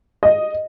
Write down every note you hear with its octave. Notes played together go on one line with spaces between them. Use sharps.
D#5